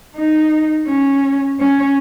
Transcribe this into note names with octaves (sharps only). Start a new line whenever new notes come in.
D#4
C#4
C#4